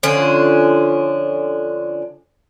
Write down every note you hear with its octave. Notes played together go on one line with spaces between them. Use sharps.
D3 F3 C#4 D4